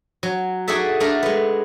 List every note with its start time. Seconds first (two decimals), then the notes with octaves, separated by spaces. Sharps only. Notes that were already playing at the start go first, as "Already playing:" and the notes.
0.23 F#3
0.68 D#4 F#4 G#4 A4 D5 E5
1.00 A3 A#3 D4 F#4 A#4
1.23 G#3 B3